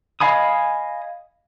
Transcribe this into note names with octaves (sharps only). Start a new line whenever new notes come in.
D#5 F5 G#5 B5 D#6